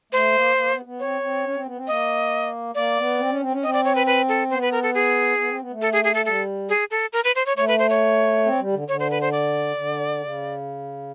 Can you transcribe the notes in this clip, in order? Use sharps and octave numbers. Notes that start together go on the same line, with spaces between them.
A3 C5
A#3
A#3
B3
B3
C4 C#5
C4
C#4
C4
B3
C4
A#3 D#5
A#3 D5
B3
C4
C#4
C4
C#4
C4 D#5
D5
C#5
B4
B4
A4
B3 C5
B4
A#4
A4
G#4
B3
C4
B3
A3
A4
G#4
G#4
A4
G3 A4
G#4
A4
A#4
B4
C5
C#5
A3 C#5
B4
C5
C#5
C4
G3
D3
D3 C#5
C5
B4
C5
D5
D3
C#3